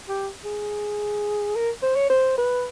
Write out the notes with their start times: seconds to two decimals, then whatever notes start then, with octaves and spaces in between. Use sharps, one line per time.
0.09 G4
0.45 G#4
1.55 A#4
1.83 C5
1.96 C#5
2.10 C5
2.38 B4